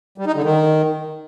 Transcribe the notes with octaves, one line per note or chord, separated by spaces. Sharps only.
G3
D#4
D3
D#3